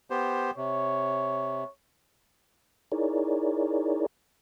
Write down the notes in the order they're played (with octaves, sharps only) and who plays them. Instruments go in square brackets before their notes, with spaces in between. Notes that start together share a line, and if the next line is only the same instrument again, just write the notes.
[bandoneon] B3 G4 C5
[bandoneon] C3 [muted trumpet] C#5
[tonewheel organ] D#4 E4 G#4 A#4 C#5 D5